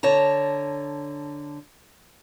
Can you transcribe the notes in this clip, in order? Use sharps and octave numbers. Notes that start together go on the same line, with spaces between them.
D3 C#5 A5 A#5